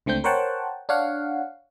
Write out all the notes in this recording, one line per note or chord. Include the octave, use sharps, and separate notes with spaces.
C#2 D3 A3 C4 G6
A#4 C5 C#5 F#5 G5 A5
D4 C#5 F5 F#5